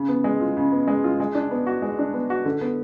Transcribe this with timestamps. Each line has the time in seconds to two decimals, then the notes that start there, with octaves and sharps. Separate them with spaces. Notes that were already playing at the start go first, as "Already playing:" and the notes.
Already playing: C#3
0.09 B3
0.24 G#3
0.40 F4
0.57 C#3
0.72 B3
0.88 G#3
1.04 F4
1.20 G#3
1.35 D4
1.51 B3
1.67 F#4
1.82 G#3
1.99 D4
2.14 B3
2.30 F#4
2.45 D3
2.61 B3